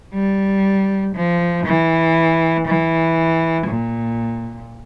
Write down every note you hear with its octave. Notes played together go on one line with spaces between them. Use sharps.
G3
F3
E3
E3
A#2